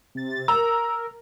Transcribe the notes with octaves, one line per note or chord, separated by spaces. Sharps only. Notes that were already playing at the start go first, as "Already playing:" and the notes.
C3 A6
A#4 A#5 E6